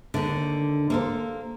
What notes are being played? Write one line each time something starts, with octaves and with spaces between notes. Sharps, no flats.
D#2 D3
A#3 A4 C5